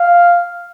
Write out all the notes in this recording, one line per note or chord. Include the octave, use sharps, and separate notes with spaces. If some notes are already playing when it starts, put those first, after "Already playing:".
Already playing: F5